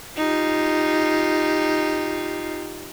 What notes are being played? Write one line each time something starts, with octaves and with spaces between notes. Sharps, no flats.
D#4 F4 G4